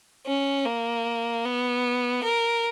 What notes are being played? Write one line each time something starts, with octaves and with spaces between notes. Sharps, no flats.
C#4
A#3
B3
A#4